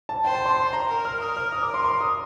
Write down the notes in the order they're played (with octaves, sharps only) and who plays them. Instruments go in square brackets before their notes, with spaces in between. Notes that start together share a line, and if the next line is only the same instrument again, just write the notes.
[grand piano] A5
[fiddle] C5 [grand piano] G5
[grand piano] A5
C6
C6
A#5
[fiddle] A#4
[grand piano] F6
[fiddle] A#4 [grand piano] D#6
[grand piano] F6
D#6
D6
C6
C6
D#6